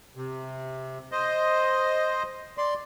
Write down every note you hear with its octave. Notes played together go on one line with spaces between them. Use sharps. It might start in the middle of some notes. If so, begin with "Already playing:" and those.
C3
C5 D#5
D5 C6